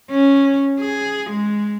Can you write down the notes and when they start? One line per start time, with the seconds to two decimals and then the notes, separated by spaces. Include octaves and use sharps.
0.10 C#4
0.80 G#4
1.30 G#3